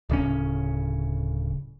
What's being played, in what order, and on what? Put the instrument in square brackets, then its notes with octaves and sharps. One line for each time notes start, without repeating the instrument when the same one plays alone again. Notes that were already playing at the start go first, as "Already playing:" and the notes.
[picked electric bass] D1 C#3 C#4